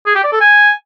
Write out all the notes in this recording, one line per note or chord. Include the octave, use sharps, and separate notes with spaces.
G#4
G4
D5
A4
G#5